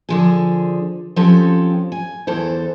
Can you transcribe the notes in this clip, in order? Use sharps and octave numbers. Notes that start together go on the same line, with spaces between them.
D3 F3 G#4
F3 C4 C#4 G4 A4
G#5
E2 E3 A4 C5